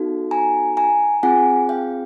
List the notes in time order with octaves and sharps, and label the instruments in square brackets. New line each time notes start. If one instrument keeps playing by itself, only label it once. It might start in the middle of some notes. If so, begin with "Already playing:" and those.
Already playing: [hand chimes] B3 D#4 F#4 A4
G#5 A#5
G#5 A#5
C4 F4 G#4 F#5 G#5
F5 G5